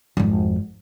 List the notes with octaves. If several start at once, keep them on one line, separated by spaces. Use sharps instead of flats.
G#1 F2